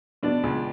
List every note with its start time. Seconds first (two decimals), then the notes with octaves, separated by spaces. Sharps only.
0.23 B2 D4
0.43 C#2